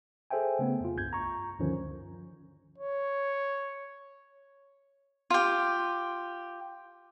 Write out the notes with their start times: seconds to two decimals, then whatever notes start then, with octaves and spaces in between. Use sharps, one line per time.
0.31 G#4 A4 C5 E5 G5 G#5
0.59 C#3 A3 B3
0.80 F2 F4
0.96 C2 G2 G6 G#6
1.13 A#5 C#6
1.59 D2 G2 D3 D#3 F3 C#4
2.78 C#5
5.30 F4 G4